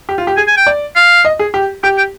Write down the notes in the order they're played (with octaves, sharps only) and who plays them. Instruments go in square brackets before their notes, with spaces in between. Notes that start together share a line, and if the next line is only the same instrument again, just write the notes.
[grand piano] G4
F4
G4
[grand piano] G#4 [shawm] G#5
[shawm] G#5
G5
[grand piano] D5
[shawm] F5
[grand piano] D#5
G#4
G4
[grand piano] G4 [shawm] G5
[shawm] G5